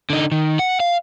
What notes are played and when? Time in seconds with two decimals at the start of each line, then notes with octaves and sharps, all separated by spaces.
0.10 D3 D#4
0.32 D#3
0.59 F#5
0.80 F5